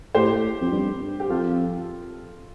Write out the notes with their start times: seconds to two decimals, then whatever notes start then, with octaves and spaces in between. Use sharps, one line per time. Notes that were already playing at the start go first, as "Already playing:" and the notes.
0.15 A2 G4 C5
0.61 F2
0.72 G2
1.20 G4
1.30 F2 F4 A4